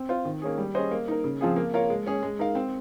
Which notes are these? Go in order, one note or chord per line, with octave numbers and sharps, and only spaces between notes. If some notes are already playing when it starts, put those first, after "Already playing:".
Already playing: C4
F4 C5
D#3
A#3 C#4 G#4
G3
C#4 G#4 C5 D#5
A#3
D#4 A#4
C#3
F3 C4 F4 G#4
A#3
F4 A#4 C#5 F5
G#3
C#4 G#4 C#5
G#3
D#4 A#4 F5
C4